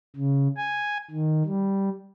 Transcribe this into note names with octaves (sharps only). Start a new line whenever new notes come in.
C#3
G#5
D#3
G3